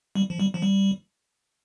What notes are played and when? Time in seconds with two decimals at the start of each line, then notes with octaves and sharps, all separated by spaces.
0.15 G3
0.30 F3
0.40 G3
0.54 F3
0.62 G3